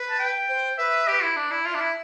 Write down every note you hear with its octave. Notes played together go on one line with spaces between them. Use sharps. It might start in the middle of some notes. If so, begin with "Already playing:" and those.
Already playing: B4
A5
G5
C5
B4 E5
G4
E4
D4
E4 D5
F4 E5
D4
E4